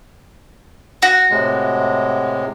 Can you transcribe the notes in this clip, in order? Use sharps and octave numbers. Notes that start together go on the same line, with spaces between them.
F#4
A2 C3 G#3